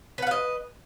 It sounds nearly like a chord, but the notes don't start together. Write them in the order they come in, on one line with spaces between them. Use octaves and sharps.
B4 F#5 F5 D#5